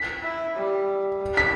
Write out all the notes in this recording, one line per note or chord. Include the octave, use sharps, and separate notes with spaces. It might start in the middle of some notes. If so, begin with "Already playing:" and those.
Already playing: B6
E4
G3
G3
B6